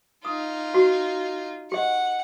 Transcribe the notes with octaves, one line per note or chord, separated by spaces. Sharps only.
D#4 F4 D#6
F#4
G4 D#5 F#5